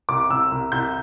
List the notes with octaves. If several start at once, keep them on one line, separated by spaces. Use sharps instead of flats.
C2 D6
C2 E6
C2
C2 G6